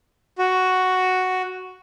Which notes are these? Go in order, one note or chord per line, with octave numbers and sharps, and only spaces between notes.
F#4